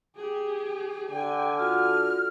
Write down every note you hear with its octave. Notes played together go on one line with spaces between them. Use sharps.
G4 G#4
D3 G5 G#5
F4 F#4 A4 F6